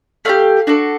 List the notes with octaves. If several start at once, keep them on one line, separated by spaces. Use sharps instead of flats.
A3 D4 G4 F5
D4 F#4 A4